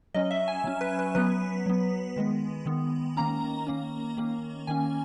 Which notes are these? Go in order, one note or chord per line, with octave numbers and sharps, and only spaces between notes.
F#3 C#4 D#5
E5
G#5
F#3 C#4
B4
B4
F#3 B3 B4
F#3 B3
D#3 G#3 B3
D#3 G#3 B3
D#3 A#3 C#4 A#5
D#3 A#3 C#4
D#3 A#3 C#4
D#3 A#3 C#4 G#5